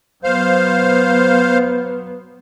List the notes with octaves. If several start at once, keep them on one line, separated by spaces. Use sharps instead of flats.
F#3 B3 C5 F5